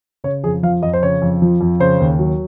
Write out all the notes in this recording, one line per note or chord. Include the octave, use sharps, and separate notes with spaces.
C#3 C#5
F2 G#4
F3 F5
F2 D#5
C5
C#3 C#5
F2
F3
F2
C#3 C5
D#2
F#3